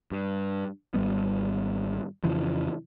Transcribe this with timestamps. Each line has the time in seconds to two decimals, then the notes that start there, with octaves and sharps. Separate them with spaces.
0.12 G2
0.94 G#1 G3 B3
2.24 F2 C#3 E3 F3